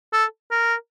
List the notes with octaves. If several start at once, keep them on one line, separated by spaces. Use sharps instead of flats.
A4
A#4